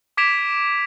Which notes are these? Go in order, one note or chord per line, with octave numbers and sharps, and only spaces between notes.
D6 G#6 B6 D7 E7 F7